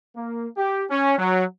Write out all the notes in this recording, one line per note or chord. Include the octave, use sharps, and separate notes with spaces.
A#3
G4
C#4
F#3